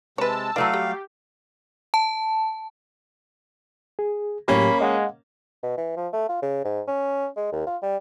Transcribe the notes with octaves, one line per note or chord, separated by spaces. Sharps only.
C3 G#3 B4 C#5 A5 E6
E3 F#3 A3 D5 F5
G3 G4
A5
G#4
A2 F#3 A#3 C#4 G4 B5
G#3 D#5 F5 F#5
B2
E3
F3
A3
F4
C#3
G#2
C#4
G#3
D#2
F4
G3